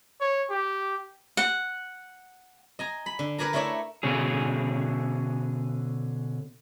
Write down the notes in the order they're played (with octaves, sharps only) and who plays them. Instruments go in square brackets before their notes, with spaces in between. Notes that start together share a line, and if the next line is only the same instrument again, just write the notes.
[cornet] C#5
G4
[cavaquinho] F#5
[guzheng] D#5 G#5 A#5
B5
D3
A#4 B4 D5 G#5 A#5
A3 E4 A#4 C#5 D5 E5
[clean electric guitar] B2 D3 C#4 G#4